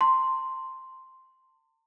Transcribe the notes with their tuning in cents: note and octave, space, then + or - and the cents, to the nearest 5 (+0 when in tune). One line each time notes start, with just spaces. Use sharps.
A5 +45 C6 +0